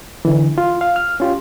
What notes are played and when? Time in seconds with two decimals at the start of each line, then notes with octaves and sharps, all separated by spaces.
0.25 D3 E3
0.58 F4
0.81 F5
0.96 F6
1.20 C#4 F4 G4